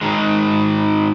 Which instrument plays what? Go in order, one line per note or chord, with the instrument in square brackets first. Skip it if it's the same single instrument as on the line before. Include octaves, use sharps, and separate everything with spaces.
[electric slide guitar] G#2 D#3 G#3